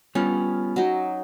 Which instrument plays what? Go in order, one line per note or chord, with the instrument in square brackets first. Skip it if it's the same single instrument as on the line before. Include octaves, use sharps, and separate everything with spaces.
[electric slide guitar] G3 B3 F4 [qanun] C#4
[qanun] F#3 D#4